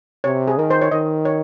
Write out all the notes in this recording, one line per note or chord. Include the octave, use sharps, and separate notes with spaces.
C3 C#5
G#4
D#3 A#4
C5
C#5
D#3 D#5
C#5